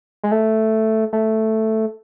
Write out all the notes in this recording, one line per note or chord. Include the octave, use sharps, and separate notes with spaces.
G#3
A3
A3